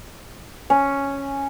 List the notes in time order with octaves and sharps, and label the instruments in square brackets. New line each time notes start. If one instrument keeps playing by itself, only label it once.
[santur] C#4